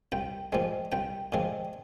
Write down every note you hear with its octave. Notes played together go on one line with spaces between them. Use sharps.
C2 G5
A#2 F3 G#3 C4
C2 G5
A#2 F3 G#3 C4